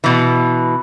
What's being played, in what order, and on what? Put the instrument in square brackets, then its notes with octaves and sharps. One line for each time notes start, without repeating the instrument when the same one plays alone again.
[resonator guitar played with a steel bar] B2 E3